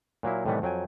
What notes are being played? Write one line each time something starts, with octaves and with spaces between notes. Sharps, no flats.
A#2 F#3 A#3 E4
A2 C3 D#3 E3 G3 B3
F2 F#3 G5 G#5